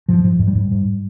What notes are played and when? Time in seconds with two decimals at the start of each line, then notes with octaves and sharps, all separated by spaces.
0.08 G#2 F3
0.24 G#2 F3
0.39 G#2
0.48 G3
0.55 G#2
0.71 G#2